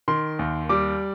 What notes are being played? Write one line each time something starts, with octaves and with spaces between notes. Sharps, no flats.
D#3 C6
D#2
G3 D6